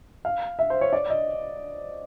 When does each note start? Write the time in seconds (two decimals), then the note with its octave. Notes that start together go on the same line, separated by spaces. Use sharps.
0.25 F5
0.59 E5
0.70 C5
0.81 C#5
0.93 D5
1.10 D#5